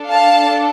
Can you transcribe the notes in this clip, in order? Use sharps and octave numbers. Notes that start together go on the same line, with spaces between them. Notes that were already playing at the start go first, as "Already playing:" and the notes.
Already playing: D4 A4
F5 A5